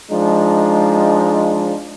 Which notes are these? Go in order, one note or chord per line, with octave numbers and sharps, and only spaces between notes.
F3 G#3 D4 D#4